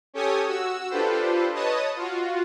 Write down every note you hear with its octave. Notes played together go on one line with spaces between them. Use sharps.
C#4 G4 A4 C#5 G#5 D#6
F#4 E6
D4 F4 G4 A4 B4 C5
B4 C#5 D#5 A5 D#6
F4 F#4